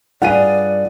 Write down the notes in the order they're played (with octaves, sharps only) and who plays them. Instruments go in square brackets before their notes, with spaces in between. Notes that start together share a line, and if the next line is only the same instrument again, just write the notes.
[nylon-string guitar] G2 F4 G#4 [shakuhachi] D5 [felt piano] F#5 D#7